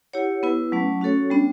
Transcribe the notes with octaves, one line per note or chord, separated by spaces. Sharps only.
E4 G4 C#5 F#5
B3 E4 B4
F#3 A3 C#4
C#4 F#4 A4 C#5
G3 B3 D4